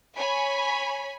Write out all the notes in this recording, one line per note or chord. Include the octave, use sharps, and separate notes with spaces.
C#5 G#5 B5